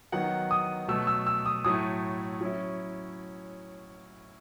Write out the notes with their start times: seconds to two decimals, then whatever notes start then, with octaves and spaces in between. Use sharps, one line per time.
0.12 D#3 F#3 B3 F#5
0.51 D#6
0.88 B2 F#3 A3 E6
1.07 E6
1.27 E6
1.46 D#6
1.64 A2 F#3 A3 E4 D#6
2.41 F#3 C#4 E4